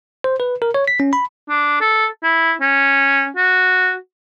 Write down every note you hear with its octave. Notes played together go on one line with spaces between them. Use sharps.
C5
B4
A#4
C#5
B6
C#4
B5
D4
A4
E4
C#4
F#4